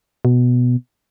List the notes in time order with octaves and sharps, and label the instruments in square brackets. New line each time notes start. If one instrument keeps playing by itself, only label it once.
[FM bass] B2